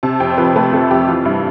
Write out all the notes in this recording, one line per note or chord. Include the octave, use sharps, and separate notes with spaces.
C3 A5
F2 G5
C5
F3 B4
A3 B4
C3 A4
F2 G4
E3 F4
G2 E4